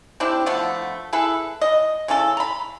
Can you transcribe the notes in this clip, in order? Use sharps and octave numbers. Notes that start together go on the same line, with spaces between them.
C4 D4 E4 G4
D3 F3 A3 B3
E4 G#4 A4 B4
D#5
C#3 E3 C#4 A4
A#5 B5